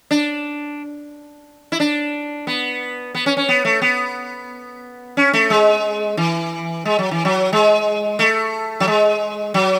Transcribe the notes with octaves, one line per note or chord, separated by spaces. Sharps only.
D4
E4
D4
B3
B3
C#4
C#4
B3
A3
B3
C#4
A3
G#3
E3
G#3
F#3
E3
F#3
G#3
A3
F#3
G#3
F#3